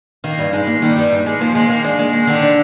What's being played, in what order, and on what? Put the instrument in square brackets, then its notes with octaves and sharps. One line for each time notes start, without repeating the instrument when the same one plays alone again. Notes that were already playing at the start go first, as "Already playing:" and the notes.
[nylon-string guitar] D#3 [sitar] A#3
[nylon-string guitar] G2
[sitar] G#3 [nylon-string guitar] D#4
[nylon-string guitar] A#3
[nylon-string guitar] D#3 [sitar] G3
[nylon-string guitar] G2 [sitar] G3
[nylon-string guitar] D#4
[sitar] G#3 [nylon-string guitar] A#3
[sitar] F3 [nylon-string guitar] A#3
[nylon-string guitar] D#3 [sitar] G#3
[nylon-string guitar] D#3 [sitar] A#3
[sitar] G#3 [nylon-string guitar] D4
[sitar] G#3 [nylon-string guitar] A#3
[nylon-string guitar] D#3
[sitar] D3 [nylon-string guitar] D#3
[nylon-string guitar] D4